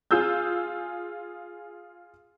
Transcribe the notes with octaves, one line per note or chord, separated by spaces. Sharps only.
F4 G#4 E6 G6